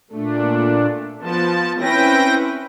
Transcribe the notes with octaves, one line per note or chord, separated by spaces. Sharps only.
A#2 A3 D4
F3 B3 A5
C4 C#4 E4 B4 G5 A#6